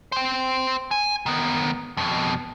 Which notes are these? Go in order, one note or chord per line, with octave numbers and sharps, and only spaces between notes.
C5 G5
G#5
D#3 B3
F2 B2